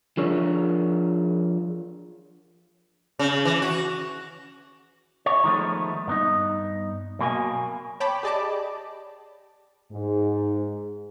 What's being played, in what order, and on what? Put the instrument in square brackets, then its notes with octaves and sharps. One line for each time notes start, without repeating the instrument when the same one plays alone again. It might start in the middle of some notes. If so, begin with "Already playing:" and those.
[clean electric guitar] F3 D4 G#4 A#4 C#5
[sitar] C#3
E3
F#4
[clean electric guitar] C#5
D#3 F3 G#3 A3 B3
G2 B3 D#4
B1 B2 A#3 G#5
[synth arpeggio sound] C#5 G5 A5 B5 D6
G4 G#4 D5 D#5 A5 D6
[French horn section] G#2